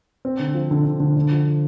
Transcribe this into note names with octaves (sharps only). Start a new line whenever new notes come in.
C4
D3
F3
D3
D3
D3
D3
F3